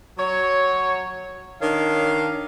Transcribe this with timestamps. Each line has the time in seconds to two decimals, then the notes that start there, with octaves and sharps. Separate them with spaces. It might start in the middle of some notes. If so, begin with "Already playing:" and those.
0.18 F#3 C#5
1.61 D#3 D4 A#4 C#5 F5